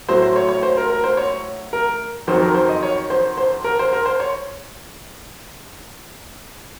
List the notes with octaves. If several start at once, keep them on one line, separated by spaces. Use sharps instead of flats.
A2 F#3 C5
C5
C#5
C#5
C5
A#4
A#4
C5
C#5
A#4
F2 D#3 F#3 C5
A#4
C5
D#5
C#5
C5
C5
A#4
C5
A#4
C5
C#5